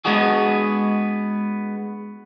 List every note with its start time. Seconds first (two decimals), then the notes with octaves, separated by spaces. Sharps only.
0.05 G#3 B3 D4 F#4 G#4